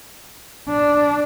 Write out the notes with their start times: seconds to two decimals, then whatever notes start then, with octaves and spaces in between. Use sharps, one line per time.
0.69 D4